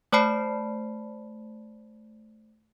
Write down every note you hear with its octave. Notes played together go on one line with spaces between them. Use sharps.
A3 C5 D5 A5 B5 C7